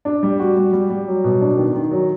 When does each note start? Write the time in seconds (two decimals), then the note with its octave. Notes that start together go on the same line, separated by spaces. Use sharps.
0.05 D4
0.23 G3
0.40 F#4
0.57 G3
0.73 G3
0.90 G3
1.07 F#3
1.24 B2
1.41 D4
1.57 D#3
1.75 D#3
1.91 F#3